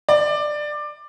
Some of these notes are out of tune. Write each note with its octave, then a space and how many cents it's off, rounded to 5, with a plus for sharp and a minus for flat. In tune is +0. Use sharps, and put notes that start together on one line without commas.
D5 +15